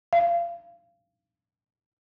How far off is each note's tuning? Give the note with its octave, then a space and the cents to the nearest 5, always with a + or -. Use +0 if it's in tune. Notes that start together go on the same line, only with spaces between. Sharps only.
F5 -25